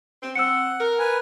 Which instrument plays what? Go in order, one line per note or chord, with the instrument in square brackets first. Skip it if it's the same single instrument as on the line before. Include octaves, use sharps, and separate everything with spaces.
[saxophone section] C4
[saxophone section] C4 [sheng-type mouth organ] F#5 [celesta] E6 C#7
[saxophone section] A#4
[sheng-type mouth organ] B4 G#5